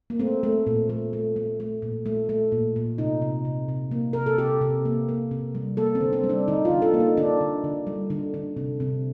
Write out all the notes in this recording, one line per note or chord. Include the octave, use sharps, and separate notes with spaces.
A#3
A3 C4
A3
A#2
A3
A3
A3
A3
A#2
A3
A3
A#2
A#2
C3 D#4
C3
C3
C3
A#3
C3 A#4
A4
C3 G4
C3
A#3
A#3
C3
G3
A#3 A4
C4
D3
C4
G3
D4
D3 D#4
F4
D3
A4
A#3
D#4
D3 D4
D3
D3
G3
D3
D3
C3
C3